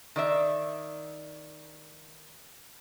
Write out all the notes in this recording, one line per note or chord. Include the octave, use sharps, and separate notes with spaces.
D#3 D5 E5